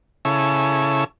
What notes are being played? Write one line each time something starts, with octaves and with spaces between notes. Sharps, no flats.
C#3 E4 A4 C#5 G#5 E6